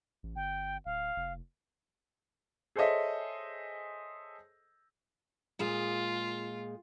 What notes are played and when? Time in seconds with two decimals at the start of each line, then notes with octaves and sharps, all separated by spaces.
0.23 A1
0.36 G1 G5
0.85 D1 F5
1.16 F1
2.76 G#4 A4 C5 C#5 D#5 E5
5.59 A#2 G#3 F4 G#4